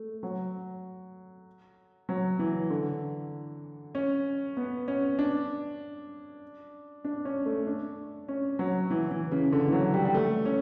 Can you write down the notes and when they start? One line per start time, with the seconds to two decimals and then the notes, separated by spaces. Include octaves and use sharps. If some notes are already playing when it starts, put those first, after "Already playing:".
Already playing: A3
0.23 F#3
2.09 F#3
2.39 E3
2.70 D3
3.95 C#4
4.57 B3
4.88 C#4
5.19 D4
7.05 D4
7.25 C#4
7.46 A3
7.67 D4
8.28 C#4
8.59 F#3
8.91 E3
9.11 E3
9.32 C#3
9.52 D3
9.68 E3
9.72 F#3
9.94 G3
10.05 G3
10.15 A3
10.45 C#4